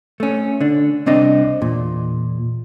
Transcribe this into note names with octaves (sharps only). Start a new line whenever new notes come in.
A3 C#4
D3 D4
C2 C4 D4 D#5
E2 A#2